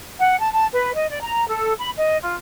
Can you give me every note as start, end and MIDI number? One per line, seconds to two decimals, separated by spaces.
0.19 0.39 78
0.41 0.50 81
0.53 0.65 81
0.73 0.93 71
0.94 1.08 75
1.09 1.19 74
1.21 1.47 82
1.48 1.73 69
1.78 1.90 83
1.98 2.18 75
2.22 2.35 65